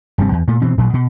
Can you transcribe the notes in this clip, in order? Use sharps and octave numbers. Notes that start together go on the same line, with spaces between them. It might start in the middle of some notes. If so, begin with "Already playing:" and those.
F1 G2 G3 C4
E2
A#2 A3
B2 E3 C4
A1 A#2 F#3
B2